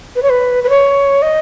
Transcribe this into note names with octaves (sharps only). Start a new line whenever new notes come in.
B4
C#5
B4
B4
C#5
D#5